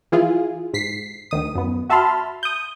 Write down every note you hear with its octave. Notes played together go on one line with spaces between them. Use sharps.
E3 E4 F4 G#4
G#2 B6 C7
D2 D#3 D#6
F#2 B3
F#4 E5 A5 B5 C6 F6
D#6 G6